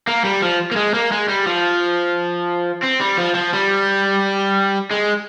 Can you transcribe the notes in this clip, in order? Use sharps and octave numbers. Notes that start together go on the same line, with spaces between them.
A#3
G3
F3
A#3
G#3
A#3
G#3
G3
F3
C4
G3
F3
F3
G3
G#3